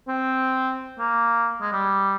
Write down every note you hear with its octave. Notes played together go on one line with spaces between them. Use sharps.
C4
A#3
G#3
G3